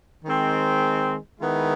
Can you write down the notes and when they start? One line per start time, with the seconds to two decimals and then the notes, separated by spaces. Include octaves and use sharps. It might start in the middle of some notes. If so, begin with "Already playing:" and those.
0.25 D#3 G#3 C4
1.40 D#3 G#3 B3 E4